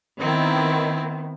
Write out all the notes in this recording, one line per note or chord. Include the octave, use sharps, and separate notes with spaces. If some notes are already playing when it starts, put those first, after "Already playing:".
D#3 B3 C4 E4